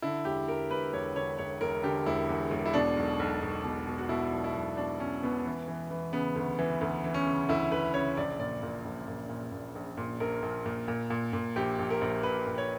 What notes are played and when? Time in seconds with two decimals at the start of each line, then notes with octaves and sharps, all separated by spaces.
0.02 D3 E4
0.25 E1 G4
0.48 E1 A#4
0.70 E1 B4
0.93 E1 C#5
1.15 D3 C#5
1.38 E1 C#5
1.61 E1 A#4
1.83 D3 G4
2.06 E1 E4
2.29 E2
2.51 E1
2.66 E4
2.73 B2 D4
2.97 B1
3.19 B1
3.42 B1
3.64 B2
3.86 B2
3.98 F#4
4.09 B2 E4
4.32 B1
4.44 E4
4.56 B1
4.77 B2 D4
5.00 B2 C#4
5.23 B2 B3
5.46 E3
5.68 E3
5.91 E3
6.13 C#3 B3
6.36 D2
6.59 E3
6.81 D2
7.04 E3
7.14 C#4
7.26 C#3
7.49 D2 E4
7.71 D2 B4
7.94 C#3 C#5
8.17 A#1 D5
8.39 A#2 D5
8.63 A#2
8.85 A#1
9.08 A#2
9.29 A#2
9.52 A#2
9.75 A#1
9.97 A#2
10.20 A#1 A#4
10.42 A#1
10.66 A#2
10.88 A#2
11.10 A#2
11.33 A#2
11.56 A#1 G4
11.79 A#1
11.90 A#4
12.01 A#1
12.23 A#1 B4
12.47 A#2
12.58 C#5